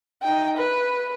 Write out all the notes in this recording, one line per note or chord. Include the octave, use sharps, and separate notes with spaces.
D#4 G5
B4